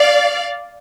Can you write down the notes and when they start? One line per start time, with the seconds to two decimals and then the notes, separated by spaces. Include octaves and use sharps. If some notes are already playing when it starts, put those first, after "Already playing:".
Already playing: D5 F5